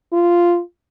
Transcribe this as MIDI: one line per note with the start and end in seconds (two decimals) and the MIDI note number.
0.13 0.60 65